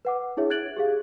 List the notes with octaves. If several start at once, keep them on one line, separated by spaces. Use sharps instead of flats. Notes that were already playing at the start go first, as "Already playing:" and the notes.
B4 F#5 D6
D4 E4 G#4 C#5 E5
F#6 G#6 A6 D7 F#7
G4 G#4 F5